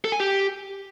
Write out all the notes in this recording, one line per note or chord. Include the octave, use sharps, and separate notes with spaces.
A4
G#5
G4